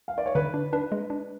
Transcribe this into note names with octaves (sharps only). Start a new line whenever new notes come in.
F5
D5
C#5
D3 B4
D4
D4 B4
G#3
D4